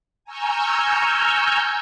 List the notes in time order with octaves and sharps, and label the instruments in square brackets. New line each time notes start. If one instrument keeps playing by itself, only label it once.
[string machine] G#5 A#5 C#6 E6 F6 G6